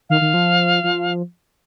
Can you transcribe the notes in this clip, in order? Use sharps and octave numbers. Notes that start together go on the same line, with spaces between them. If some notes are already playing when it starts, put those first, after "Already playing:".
D#3 F5
D#3
F3
F3